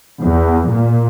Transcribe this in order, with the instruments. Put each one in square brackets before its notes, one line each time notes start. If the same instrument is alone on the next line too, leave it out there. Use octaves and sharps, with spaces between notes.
[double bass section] E2
A#2